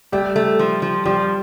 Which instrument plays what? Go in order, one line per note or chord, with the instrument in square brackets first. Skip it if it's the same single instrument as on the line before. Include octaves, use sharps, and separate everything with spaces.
[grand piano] G3 G4 [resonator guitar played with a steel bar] A3
[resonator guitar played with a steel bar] A3
F3
F3
[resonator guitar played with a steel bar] F3 [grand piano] G3 G4